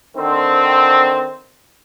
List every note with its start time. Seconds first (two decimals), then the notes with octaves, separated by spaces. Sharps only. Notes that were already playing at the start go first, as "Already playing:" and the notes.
0.17 D3 D#3 C4